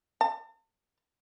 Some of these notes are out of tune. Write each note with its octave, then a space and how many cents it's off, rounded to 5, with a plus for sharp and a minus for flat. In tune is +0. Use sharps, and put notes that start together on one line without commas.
A5 +40